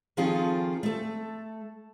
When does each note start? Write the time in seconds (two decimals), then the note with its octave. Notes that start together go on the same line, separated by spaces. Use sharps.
0.17 D#3 F3 C4 F4 G#4 A4
0.83 A3 A4